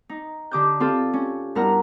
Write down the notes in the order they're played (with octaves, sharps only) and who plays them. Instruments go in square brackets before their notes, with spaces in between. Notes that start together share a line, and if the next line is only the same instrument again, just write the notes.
[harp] D#4
D3 G4 D6 D#6 G6
C4 F4 G4 A4
C#4
G2 B3 E4 A#4 F#5 A#5